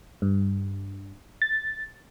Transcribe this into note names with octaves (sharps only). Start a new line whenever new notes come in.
G2
A6